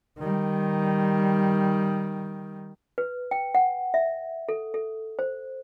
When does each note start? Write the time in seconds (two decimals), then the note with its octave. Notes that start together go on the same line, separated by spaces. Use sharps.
0.19 D#3 G3
2.98 B4
3.31 G5
3.55 F#5
3.94 E5
4.49 A4
4.74 A4
5.19 C5